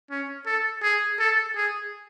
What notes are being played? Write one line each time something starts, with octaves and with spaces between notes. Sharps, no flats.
C#4
A4
G#4
A4
G#4